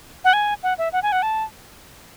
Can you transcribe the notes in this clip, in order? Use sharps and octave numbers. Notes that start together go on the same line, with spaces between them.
F#5
G#5
F#5
E5
F#5
G#5
F#5
A5